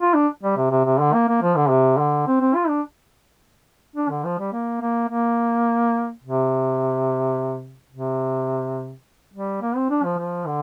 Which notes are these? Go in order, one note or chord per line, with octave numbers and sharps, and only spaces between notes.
F4
D4
G3
C3
C3
C3
D3
A#3
A#3
F3
D3
C3
D3
C4
C4
F4
D4
D4
D3
F3
G3
A#3
A#3
A#3
C3
C3
G3
A#3
C4
D4
F3
F3
D3